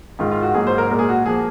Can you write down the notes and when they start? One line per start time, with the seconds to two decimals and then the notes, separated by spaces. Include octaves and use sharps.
0.19 G#2 D#3 G#3 F4
0.31 F4
0.43 F#4
0.54 G#2 F#3 A#3 G#4
0.67 C5
0.78 A#4
0.91 A#2 G#3 A#4
0.99 G#4
1.09 F#4
1.26 F3 A#3 G#4